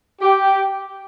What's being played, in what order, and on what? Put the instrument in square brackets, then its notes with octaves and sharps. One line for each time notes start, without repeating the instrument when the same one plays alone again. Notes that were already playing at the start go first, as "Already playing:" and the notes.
[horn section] G4